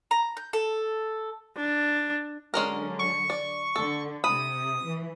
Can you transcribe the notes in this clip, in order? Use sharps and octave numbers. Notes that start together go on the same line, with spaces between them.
A#5
G6
A4
D4
D3 F#3 G#3 C#4 A#4
C#6
D5
D3 A4
C3 B5 D#6
E3